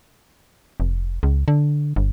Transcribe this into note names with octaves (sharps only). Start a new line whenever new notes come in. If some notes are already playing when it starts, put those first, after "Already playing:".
F1
C#2
D3
G1